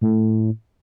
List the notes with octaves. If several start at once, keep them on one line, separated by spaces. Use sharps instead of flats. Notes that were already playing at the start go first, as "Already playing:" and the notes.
A2